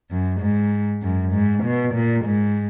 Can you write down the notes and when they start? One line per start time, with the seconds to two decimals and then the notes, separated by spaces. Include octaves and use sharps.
0.10 F#2
0.41 G#2
1.03 F#2
1.33 G#2
1.63 B2
1.94 A#2
2.25 G#2